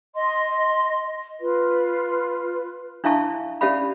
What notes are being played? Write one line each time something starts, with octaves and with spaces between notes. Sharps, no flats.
D#5 C6
F4 B4
D4 E4 E5 F5 A5 C#6
C#4 G4 D5 E5 F5 B5